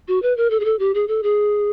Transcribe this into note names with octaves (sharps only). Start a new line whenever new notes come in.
F#4
B4
A#4
A4
G#4
A4
G4
G#4
A4
G#4